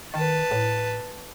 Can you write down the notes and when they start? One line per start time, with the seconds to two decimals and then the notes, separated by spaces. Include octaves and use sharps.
0.14 D#3 B4 A5
0.51 A2